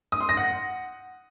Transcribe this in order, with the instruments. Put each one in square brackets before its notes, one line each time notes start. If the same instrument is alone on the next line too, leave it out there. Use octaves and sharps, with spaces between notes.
[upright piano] D#6
C6
A#6
F#5